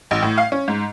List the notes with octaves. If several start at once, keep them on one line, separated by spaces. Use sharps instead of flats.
A1
A2
F5
C#4
G#2